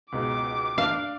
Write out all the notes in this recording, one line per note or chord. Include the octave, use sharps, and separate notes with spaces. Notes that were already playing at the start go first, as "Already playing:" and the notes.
C#2 G#2 B2 D6
D4 F5